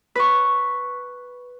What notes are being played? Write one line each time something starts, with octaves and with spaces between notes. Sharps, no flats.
B4 C#6